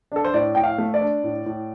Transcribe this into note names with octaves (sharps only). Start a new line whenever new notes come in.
D4 A4
C5
A2 D5
A2 G5
F5
A3
D5
D4
A2
A2